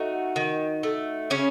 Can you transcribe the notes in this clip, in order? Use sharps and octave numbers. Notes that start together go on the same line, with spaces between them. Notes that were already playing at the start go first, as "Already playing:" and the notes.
Already playing: A3 D#4 F#4
D#3
A3
C#3 C#4